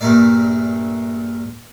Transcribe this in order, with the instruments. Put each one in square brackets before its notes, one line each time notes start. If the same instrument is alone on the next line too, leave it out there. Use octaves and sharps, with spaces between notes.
[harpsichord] A#1 G2 A#2 A3 A#3 D5